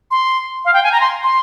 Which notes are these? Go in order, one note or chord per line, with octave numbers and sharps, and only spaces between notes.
C6
F5
G5
G#5
A#5
C6
C6